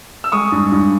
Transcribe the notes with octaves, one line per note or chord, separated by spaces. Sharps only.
E6
G#3 C#6 D#6
G2
G2